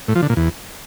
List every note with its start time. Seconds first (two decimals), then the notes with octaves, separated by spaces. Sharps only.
0.08 A2
0.15 F3
0.22 D3
0.30 A#2
0.37 E2